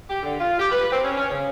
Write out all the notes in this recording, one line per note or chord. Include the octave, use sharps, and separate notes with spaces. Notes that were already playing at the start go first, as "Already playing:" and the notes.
G4
D3
F4
G4
B4
C4
C#4
C#4
C#3